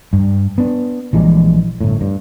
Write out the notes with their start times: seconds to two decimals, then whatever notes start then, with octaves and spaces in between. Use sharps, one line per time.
0.13 G2
0.58 B3 D4
1.13 A#1 E3 G3 G#3
1.81 G1 A2
2.01 G2